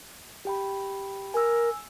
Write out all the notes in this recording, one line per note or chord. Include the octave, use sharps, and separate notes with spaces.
G4 G5 B5
A#4 G#5 E6